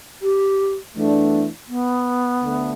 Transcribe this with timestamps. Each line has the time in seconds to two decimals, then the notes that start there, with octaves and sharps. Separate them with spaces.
0.22 G4
0.95 E2 E3 A3 B3 D4
1.68 B3
2.41 D2 D3 A3